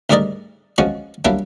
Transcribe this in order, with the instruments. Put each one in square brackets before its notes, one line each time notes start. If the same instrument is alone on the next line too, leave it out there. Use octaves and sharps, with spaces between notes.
[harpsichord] D2 G#2 G3 A#4 D5 D#5
F3 G#3 C#4 F#4
F#3 G3 A#3 D4 E4